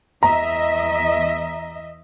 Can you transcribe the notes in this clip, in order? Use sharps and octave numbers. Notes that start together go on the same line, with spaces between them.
E2 D#5 E5 A#5